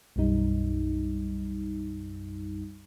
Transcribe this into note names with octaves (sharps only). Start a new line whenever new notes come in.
B1 F#2 G3 D#4